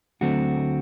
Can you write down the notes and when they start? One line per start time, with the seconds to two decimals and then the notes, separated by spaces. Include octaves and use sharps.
0.21 D2 D3 F#3 A3 C4 F#4